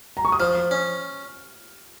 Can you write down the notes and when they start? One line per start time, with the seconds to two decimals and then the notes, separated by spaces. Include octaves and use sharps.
0.17 A#5
0.25 C#6
0.32 D#6
0.40 F3 F6
0.71 C#4